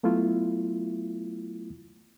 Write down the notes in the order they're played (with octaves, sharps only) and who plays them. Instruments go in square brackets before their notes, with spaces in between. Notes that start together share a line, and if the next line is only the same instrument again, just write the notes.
[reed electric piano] F#3 A3 B3 E4 F4